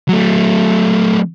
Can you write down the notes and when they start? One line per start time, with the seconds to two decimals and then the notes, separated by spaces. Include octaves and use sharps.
0.09 F#3 A3